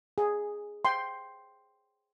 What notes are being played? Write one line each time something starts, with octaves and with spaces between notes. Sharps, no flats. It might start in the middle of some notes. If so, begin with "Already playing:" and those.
G#4
G5 C6